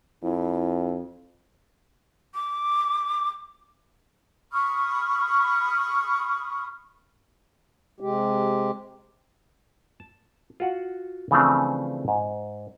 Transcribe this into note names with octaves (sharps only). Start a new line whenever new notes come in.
F2 E4
D6
B5 C#6 D#6 F6
C3 G#3 G4
A5
F4 F#4 F#5
C#3 E3 F3 A3 C4 D4
G#2